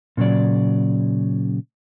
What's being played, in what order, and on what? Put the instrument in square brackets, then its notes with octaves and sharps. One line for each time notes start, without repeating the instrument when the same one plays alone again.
[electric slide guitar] A#2 C#3 F#3 D5